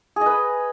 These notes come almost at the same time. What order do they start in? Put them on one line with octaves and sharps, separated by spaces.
G#4 D#5 B4